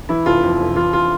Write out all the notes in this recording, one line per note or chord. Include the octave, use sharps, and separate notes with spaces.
E3 E4
F1 F4
F2
F1
E3 F4
F4